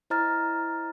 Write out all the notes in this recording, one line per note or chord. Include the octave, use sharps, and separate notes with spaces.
E4 C5 D#5 A#5 F6 A6